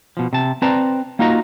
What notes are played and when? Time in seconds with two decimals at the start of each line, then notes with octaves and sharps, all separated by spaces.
0.17 B2 F3
0.33 C3 A5
0.62 C4 B4 C5 D5 A5 A#5
1.19 A#3 D#4 F4 F#4 D#5 A#5